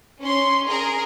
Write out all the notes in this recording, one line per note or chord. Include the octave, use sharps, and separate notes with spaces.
C#4 C6
G#4 A#4